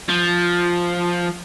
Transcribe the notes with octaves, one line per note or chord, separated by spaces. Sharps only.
F3